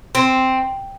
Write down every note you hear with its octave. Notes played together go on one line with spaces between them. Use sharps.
C4